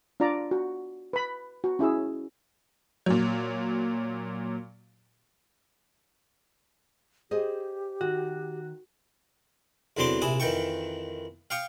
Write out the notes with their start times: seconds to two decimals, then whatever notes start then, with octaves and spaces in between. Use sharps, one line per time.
0.20 D4 F4 D5 A#5
0.51 F#4
1.13 B4 B5
1.64 F#4
1.79 C#4 E4 G#4 E6
3.06 A#2 F#3
7.31 G4 G#4 C5 D#5
8.01 D#3 F#4
9.97 E2 D3 F#3 C4 C6 D6
10.22 A#1 C3 E4 G#5 D#6
10.40 F2 D#3 E3 G5 C#6
11.50 F5 G5 C#6 D#6